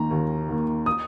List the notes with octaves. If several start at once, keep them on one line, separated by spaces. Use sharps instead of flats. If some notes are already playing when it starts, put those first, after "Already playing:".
Already playing: D#2 D#3 A#3 A#5
D#2
D#3 A#3
D#6